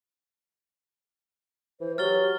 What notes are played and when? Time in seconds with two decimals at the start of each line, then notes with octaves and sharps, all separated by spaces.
1.80 E3 C5
1.98 F#3 G4 F6 A6 G7